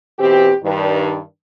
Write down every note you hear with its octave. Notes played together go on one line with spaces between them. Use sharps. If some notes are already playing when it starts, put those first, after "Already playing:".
B2 E3 C4 G4
G2 D#3